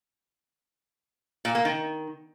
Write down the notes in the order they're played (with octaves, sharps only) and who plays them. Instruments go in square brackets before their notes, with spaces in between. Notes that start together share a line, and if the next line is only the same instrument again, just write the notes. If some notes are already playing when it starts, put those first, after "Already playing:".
[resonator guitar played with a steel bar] A#2
A#3
D#3